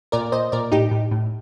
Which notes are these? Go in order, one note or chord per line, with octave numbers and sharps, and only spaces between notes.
A#2 A#4 D5
A#2 C5 D#5
A#2 A#4 D5
A2 D#4 G4
A2
A2